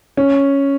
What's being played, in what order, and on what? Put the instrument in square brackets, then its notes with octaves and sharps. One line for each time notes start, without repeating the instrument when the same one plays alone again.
[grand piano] C#4